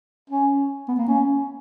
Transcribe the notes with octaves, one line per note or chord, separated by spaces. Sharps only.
C#4
B3
A#3
C#4